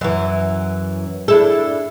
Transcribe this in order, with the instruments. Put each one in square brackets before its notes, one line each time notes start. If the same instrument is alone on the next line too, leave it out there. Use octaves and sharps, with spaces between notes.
[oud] F#2 E3
[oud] D4 E4 A4 [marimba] G#4